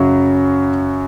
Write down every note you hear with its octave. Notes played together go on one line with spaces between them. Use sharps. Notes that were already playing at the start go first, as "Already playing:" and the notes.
Already playing: F#2 C#3 F#3